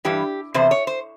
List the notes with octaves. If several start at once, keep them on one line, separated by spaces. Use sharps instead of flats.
G2 E3 G4
E2 C3 C5
C#5
C5